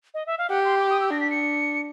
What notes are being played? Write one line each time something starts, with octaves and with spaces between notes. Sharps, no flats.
D#5
E5
F5
G4 F#5
C6
D6
D#6
E6
D4 A#6
B6
C#7